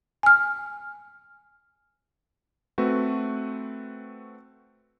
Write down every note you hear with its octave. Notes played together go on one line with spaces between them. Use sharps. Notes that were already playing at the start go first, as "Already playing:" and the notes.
G#5 F6
A3 C4 F#4 B4